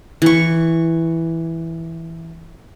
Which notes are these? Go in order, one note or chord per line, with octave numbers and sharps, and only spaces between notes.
E3 C#6